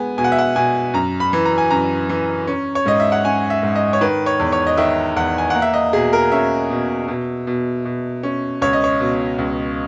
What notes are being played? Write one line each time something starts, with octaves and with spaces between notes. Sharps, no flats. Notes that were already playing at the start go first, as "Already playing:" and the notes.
Already playing: G#3 B3 G#5
B2 G#5
F#5
E5
F#5
B2 G#5
F#2 A#5
B5
E3
A#5
G#5
F#2 A#5
E3
C#4
C#5
G#2 D#5
E5
F#5
C#4 G#5
E5
G#2
D#5
C#5
D#3 B4
C#5
E2
C#5
D#5
D#3 E5
E2 F#5
G#5
A#3 F#5
E5
D#5
B2 G#4
A#4
C#4 E5
B2
B2
B2
B2
C#4
C#2 C#5
D#5
C#5
B2
C#2